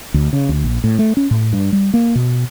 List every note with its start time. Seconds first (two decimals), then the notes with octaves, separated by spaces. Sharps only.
0.14 D2
0.33 C#3
0.49 D2
0.64 A#1
0.84 A2
0.99 A3
1.17 C#4
1.31 A2
1.53 G2
1.73 G3
1.94 A#3
2.15 B2